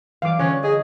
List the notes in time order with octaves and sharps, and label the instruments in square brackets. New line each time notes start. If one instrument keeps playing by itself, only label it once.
[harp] E3 G3 [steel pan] F5 D6
[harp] D3 F4 F#6 [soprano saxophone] C#4 [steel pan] C#5
[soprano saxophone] G#4 [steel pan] D#5 [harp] D#7